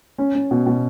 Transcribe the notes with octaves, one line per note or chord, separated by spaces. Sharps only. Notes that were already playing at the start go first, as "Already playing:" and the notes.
C#4
C#4
B2
B2